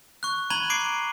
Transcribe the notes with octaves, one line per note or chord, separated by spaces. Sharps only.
C#6 F#6
A#5 B5 G#6 D#7 F#7 G7
D6 G#6 C7 D7